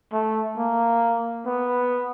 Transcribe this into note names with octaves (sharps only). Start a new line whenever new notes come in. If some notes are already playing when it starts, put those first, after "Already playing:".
A3
A#3
B3